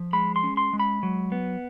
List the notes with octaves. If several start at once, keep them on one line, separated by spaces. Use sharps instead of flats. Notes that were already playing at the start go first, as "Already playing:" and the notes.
Already playing: F3
G#3 B5
C6
C#4
C6
G#3
B5
F#3
B3